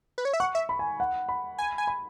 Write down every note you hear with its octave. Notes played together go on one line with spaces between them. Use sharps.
B4
C#5
E5
F#5 C#6
E5
B5
G#5
F#5
B5
G#5
G#5
B5